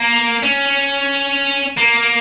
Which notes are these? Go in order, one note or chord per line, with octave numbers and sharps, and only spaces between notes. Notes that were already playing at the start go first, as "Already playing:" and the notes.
Already playing: A#3
C#4
A#3